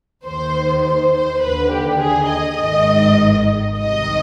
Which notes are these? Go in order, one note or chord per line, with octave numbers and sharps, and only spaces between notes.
D#2 D#3 C5
C5
C5
D#2 D3 B4
G4
G#4
D#5
G#1 G#2 D#3
C2 C3 D#3 D#5